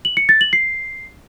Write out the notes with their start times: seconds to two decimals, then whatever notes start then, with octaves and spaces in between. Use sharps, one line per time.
0.05 F#7
0.17 C#7
0.29 A6
0.41 F#7
0.53 C7